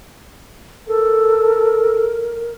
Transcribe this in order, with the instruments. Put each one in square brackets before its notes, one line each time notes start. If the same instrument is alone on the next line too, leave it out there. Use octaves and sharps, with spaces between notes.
[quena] A4 [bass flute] A#4